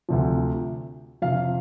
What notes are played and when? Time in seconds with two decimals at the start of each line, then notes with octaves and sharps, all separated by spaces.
0.09 D2 C3 F3
1.22 F2 C3 F3 F5